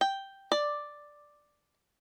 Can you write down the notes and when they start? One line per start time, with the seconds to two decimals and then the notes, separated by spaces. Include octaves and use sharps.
0.01 G5
0.52 D5